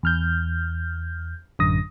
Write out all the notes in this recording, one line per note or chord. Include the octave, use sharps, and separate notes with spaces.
E2 F6 G6
A1 F#2 D3 D#6 A#6